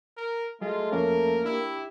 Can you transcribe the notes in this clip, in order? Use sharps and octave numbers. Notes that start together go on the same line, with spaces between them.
A#4
F#3 G#3 A3 F4
F2 F3 A#3 C#4 A#4
D4 E4 G4